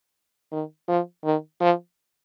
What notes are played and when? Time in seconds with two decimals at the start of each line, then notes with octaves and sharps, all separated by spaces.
0.52 D#3
0.88 F3
1.24 D#3
1.61 F3